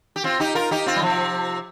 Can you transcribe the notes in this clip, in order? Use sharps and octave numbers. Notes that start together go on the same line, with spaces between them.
G4
C4 F4
D#4 G4
F4 A#4
D#4 G4
C4 F4
G3
C3 F3